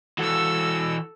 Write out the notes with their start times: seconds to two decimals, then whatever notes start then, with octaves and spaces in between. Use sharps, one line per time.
0.18 E3 F#4 A4 E6